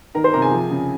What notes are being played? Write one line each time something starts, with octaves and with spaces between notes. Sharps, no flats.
D#3 A#4 A#5
C5 C6
C3 A#4 A#5
G#4 G#5
F3
C#3